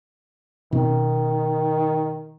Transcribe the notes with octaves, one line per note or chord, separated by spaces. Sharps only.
B2 D#3 C4 C#4